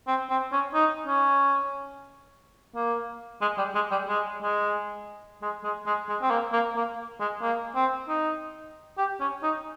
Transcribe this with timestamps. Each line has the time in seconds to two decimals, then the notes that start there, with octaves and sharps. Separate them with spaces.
0.08 C4
0.30 C4
0.52 C#4
0.74 D#4
1.07 C#4
2.75 A#3
3.42 G#3
3.58 G3
3.75 G#3
3.91 G3
4.08 G#3
4.42 G#3
5.42 G#3
5.64 G#3
5.86 G#3
6.09 G#3
6.22 C4
6.31 A#3
6.53 A#3
6.76 A#3
7.20 G#3
7.42 A#3
7.75 C4
8.09 D#4
8.98 G4
9.20 C#4
9.43 D#4